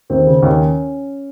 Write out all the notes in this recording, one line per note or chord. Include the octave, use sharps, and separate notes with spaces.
D#2 C4
C#3
D#2 C#4